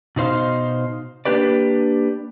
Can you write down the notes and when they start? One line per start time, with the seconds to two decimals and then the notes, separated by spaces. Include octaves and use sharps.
0.16 B2 D#4 C5 F5
1.25 A#3 D4 G4 B4 D5